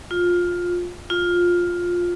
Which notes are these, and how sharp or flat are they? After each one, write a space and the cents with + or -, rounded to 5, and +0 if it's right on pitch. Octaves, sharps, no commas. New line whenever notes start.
F4 +15
F4 +10